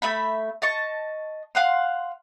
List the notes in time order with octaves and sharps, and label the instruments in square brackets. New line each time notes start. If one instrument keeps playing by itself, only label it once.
[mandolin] A3 E5 B5
D#5 A5 C#6
F5 F#5 C6